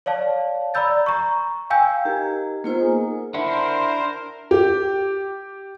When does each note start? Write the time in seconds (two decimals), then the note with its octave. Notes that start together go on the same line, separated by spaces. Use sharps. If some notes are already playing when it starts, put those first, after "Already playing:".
0.06 C#5 D5 F5 A5
0.74 D5 A#5 B5 E6 G6 A6
1.06 A#5 C#6
1.70 F5 G5 G#5 E6 G6
2.05 D#4 G4 A#4 G#6
2.64 A#3 B3 D#4 F4 A#4 C5
2.80 G#4 G#5
3.34 D4 E4 A#4 C5 F#5
4.51 G4